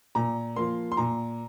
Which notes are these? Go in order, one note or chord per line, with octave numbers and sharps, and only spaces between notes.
A#2 A#5
F3 A#3 C6
C6
A#2 A#5